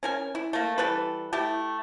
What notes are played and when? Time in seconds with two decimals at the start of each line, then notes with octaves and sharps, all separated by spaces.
0.03 C#4 A#4 G#5
0.35 E4
0.53 A3 A#3
0.78 E3 G3 A4 B4
1.33 A3 E4 G4